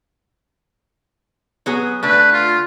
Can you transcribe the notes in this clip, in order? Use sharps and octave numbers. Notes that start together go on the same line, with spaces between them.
F#3 B3 G#4
D3 A3 B4
F4